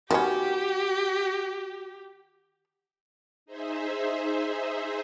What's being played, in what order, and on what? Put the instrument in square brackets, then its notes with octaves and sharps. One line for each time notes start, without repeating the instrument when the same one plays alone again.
[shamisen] D#3 B3 C#4 [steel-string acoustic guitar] F#4 [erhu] G4
[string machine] D#4 G#4 C5 E5